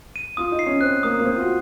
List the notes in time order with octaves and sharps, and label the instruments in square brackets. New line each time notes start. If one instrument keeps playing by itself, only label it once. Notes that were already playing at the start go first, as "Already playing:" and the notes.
[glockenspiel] D#7
[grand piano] F4 [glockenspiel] D#6
[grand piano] D#4
[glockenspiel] C7
[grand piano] C#4
[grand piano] C4 [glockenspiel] F#6
[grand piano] A#3 [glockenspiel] D#6
[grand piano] A#3
[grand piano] C4 [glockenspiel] D#6
[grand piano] F4
F#4